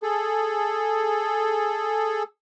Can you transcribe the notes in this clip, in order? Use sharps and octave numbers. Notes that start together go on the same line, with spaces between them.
G#4 A4